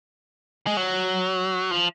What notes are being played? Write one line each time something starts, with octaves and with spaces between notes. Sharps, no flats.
G#3
F#3
F3